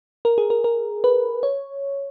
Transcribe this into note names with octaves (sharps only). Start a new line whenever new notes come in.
A#4
G#4
A#4
A#4
B4
C#5